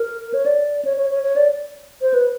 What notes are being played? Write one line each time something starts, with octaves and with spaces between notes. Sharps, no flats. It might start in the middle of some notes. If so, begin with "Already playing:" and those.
Already playing: A#4
C#5
D5
C#5
C#5
C#5
C#5
D5
C5
B4